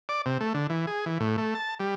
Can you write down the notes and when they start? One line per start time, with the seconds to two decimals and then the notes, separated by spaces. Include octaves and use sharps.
0.09 D5
0.26 C3
0.41 A3
0.54 D3
0.70 E3
0.87 G#4
1.06 E3
1.20 A2
1.38 A3
1.55 A5
1.80 G3